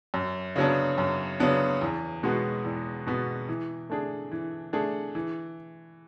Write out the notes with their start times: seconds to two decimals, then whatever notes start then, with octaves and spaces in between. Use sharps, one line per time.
0.14 F#2
0.56 C#3 F#3 B3 D4
0.98 F#2
1.40 C#3 F#3 B3 D4
1.81 E2
2.23 B2 G#3 B3 F#4
2.65 E2
3.07 B2 G#3 B3 F#4
3.49 E3
3.90 A3 D4 G#4
4.32 E3
4.73 A3 D4 G#4
5.15 E3